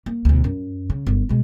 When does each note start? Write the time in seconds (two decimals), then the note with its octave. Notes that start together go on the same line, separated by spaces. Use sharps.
0.06 A#3
0.25 E1 D2
0.44 F#2
0.90 C#3
1.07 G1 F#2
1.29 B2 G#3